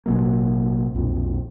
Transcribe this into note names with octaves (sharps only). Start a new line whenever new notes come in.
A1 B2 F#3 A#3
B1 F2 A#2